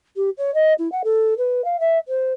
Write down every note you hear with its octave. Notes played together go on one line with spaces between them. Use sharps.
G4
C#5
D#5
E4
F#5
A4
B4
F5
E5
C5